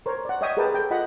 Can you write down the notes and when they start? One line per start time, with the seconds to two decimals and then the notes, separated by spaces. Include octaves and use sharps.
0.06 A#4 C5 C#5
0.25 D5 F#5
0.41 C#5 D#5 E5 G5 D#6
0.57 G4 G#4 A#4 B4 G5 A5
0.74 A4 G5
0.91 F4 D#5 F#5 B5